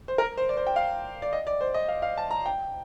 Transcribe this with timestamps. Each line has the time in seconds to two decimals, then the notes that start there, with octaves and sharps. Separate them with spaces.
0.08 C5
0.18 A#4
0.37 C5
0.49 D5
0.57 C5
0.67 G5
0.76 F5
1.22 D5
1.33 D#5
1.47 D5
1.61 C5
1.74 D#5
1.88 F5
2.02 F5
2.17 A5
2.31 A#5
2.46 G5